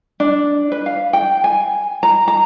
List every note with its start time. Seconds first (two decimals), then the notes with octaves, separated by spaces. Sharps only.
0.20 D4
0.72 B4
0.86 F5
1.13 G5
1.44 G#5
2.03 A#5
2.28 A#5